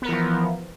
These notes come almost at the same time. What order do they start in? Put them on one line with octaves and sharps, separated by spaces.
B3 A#4 E3 F3